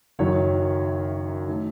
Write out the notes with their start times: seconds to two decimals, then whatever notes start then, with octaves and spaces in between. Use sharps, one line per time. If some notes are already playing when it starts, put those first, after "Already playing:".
0.19 F#1 F#2 D#3 F#3 C#5
1.48 D#3 A3